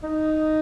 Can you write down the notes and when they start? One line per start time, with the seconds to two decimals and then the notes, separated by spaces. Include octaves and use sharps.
0.03 D#4